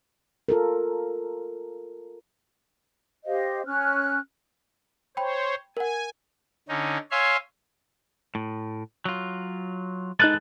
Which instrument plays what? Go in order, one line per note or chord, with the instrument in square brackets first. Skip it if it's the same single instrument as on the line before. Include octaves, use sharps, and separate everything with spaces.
[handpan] F4 A4 A#4
[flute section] G4 C5 D#5 F5
C#4 F6 F#6
[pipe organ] C5 C#5 [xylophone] G5 B5
[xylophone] A#4 F#5 [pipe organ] G#5
[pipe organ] D3 C#4 D#4
C#5 E5 F5 G#5 C6
[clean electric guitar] A2
F#3 F4
[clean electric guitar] G#3 A4 B4 [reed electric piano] D#4 F#6 A6